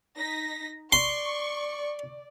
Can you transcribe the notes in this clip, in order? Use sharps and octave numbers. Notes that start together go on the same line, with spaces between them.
D#4 A#6 B6
D5 C6 C#6